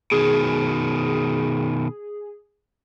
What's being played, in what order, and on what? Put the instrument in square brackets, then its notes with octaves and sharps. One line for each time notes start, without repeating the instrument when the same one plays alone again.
[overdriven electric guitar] B2 D#3 [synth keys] G#4